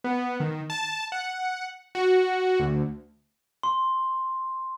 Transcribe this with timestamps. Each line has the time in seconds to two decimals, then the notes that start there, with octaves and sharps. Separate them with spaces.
0.04 B3
0.40 D#3
0.70 A5
1.12 F#5
1.95 F#4
2.60 D2
3.63 C6